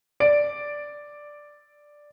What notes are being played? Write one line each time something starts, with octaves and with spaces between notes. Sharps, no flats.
D5 D7